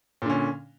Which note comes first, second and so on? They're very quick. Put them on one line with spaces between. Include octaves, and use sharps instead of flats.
A#2 D3 C#4